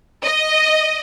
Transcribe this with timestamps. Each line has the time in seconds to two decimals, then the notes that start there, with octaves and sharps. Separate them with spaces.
0.23 D#5